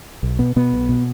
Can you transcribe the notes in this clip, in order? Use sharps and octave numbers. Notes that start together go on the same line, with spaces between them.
B1
B2 B3
B2 B3
B1
B2